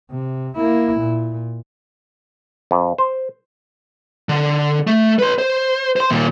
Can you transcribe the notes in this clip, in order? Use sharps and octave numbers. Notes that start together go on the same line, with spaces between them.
C3
A#3 E4
A#2
F2
C5
D3
A3
B4 C6
C5
C5 C6
D#2 A#2